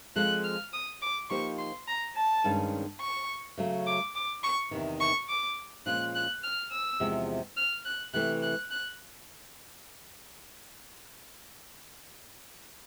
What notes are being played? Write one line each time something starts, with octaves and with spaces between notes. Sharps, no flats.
F3 G#3 C4 F4 A4 F#6
F6
D#6
D6
F3 A#3 D#4 G4 C5 C#6
C6
A#5
A5
G2 D#3 G#3 C#4
C#6
C#3 F#3 A3
D6
D6
C#6
E2 C3 D#3
C#6
D6
A#2 F3 G#3 C#4 F4 F#6
F#6
F6
E6
E2 C3 F3 G#3
F6
F#6
C3 E3 A3 F#6
F#6
F#6